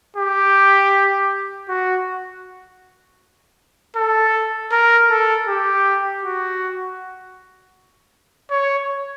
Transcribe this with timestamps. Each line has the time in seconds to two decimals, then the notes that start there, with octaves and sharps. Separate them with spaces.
0.17 G4
1.69 F#4
3.96 A4
4.72 A#4
5.10 A4
5.48 G4
6.23 F#4
8.50 C#5